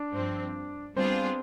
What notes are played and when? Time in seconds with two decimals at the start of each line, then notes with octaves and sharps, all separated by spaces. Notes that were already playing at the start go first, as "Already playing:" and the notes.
Already playing: D4 D5
0.12 G2 F3 C4
0.96 G3 B3 C4 D4 F4 G#4 C5